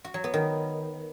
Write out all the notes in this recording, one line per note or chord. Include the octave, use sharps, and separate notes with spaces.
F#4
F#3
B3
D#3